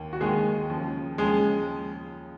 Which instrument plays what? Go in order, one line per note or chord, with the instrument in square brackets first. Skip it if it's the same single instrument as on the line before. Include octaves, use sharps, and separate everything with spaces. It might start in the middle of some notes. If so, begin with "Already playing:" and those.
Already playing: [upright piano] D#2 D#3 A#3
[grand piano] F#4
[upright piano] D#2 D#3 A#3 [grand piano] G#3 G#4
[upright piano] D#2 C#3 F3
[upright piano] D#2 C#3 F3 [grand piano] G#3 G#4